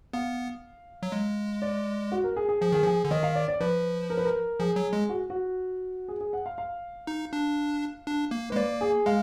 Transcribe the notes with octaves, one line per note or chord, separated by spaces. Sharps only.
B3 F5
F#3
G#3
D5
F#4
A#4
G#4
G#4
F3 G#4
D#3 G#4
F3 G#4
D3
D#3 D#5
F5
D5
D5
F3 B4
A#4
B4
A#4
F3 G#4
F#3
G#3
F#4
F#4
G#4
G#4
F#5
F5
F5
D#4
D4
D4
A#3
G#3 B4
A#3 D5
G#4
G#3 F5